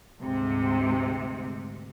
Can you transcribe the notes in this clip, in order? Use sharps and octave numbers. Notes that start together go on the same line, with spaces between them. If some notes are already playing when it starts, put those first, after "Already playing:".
D2 G#2 C3